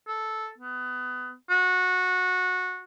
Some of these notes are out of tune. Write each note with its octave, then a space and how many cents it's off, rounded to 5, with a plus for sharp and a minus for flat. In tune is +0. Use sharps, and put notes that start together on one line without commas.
A4 -5
B3 +25
F#4 -20